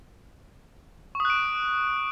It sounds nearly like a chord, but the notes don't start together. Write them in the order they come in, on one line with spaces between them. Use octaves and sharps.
C#6 D#6 F#6 D7